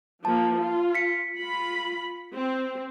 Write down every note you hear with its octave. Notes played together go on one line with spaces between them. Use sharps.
F3 A#3 A5
F4
B6 C#7
F4 B5
C4